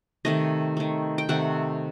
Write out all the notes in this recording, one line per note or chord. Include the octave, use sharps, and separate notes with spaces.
C3 D#3 A3 D#5
D#3 A3
G5
C3 D#3 A3 F#5